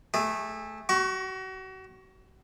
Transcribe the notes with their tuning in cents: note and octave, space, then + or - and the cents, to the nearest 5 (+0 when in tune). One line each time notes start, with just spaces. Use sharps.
A3 -10 G#4 -35
F#4 +35 C#6 +0